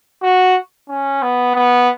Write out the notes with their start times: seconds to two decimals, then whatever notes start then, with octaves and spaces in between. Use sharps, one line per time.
0.23 F#4
0.89 C#4
1.22 B3
1.55 B3